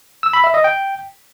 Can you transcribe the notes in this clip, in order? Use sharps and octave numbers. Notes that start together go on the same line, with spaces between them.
E6
B5
E5
D#5
G5